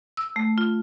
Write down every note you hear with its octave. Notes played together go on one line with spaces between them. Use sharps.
E6
A3
F4